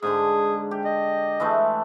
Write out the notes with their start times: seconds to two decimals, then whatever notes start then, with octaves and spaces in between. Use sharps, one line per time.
0.02 G#2 D3 G#4 C6
0.71 G4
0.85 D#5
1.40 E3 G#3 A3